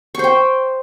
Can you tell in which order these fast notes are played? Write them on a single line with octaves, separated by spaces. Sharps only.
C#6 C5 G5